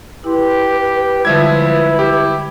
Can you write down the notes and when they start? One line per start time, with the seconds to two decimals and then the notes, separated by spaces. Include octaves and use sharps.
0.24 E4 G4 B4 C6
1.25 D3 F3 G3 G#3 E4 B4 E5 G#6
1.99 G4